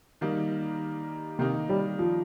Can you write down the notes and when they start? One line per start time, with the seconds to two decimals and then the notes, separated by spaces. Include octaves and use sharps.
0.21 D#3 G3 A#3 D#4
1.39 C3 D#3 A#3 D#4
1.69 G3
1.99 F3